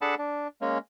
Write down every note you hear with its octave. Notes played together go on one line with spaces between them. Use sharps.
D4 G#4 A4 F#5 A5 B5
D4
G#3 A#3 C#4